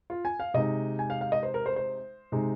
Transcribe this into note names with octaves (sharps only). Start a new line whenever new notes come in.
F4
G#5
F5
C3 G#3 D#4 D#5
G#5
F5
F5
D#5
C5
A#4
C5
C5
C3 G#3 D#4